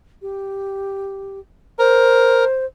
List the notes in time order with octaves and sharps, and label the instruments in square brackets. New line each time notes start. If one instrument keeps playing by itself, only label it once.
[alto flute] G4
[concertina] A#4 [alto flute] C5